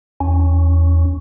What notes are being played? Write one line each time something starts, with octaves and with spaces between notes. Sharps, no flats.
E2 C#4